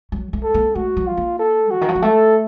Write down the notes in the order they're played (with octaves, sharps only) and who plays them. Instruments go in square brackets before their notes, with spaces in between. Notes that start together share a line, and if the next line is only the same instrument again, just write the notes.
[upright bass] F#3
A3
[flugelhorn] A4
[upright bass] A#3
[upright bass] A3 [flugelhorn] F#4
[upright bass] F#3
[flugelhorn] F4
[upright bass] A#3
[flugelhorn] A4
[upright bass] C#3 [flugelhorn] F#4
[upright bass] D#3
F3
F#3
[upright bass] A3 [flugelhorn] A4